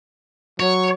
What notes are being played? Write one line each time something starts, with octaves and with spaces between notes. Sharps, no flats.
F#3 C#5